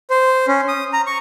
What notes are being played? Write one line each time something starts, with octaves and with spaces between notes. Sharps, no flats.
C5
C#4
D#6
A#5
C#6